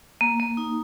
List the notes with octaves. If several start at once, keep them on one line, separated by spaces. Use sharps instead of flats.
A#3
A#3
D#4